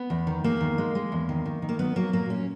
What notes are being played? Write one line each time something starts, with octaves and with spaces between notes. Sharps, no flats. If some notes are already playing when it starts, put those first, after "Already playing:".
Already playing: B3
E2
D#3
E2 A#3
D#3
G#3
G#3
E2
D#3
D#3
D#3
A#3
F#3 B3
F#3 A#3
A#2 A#3
A#2 C#4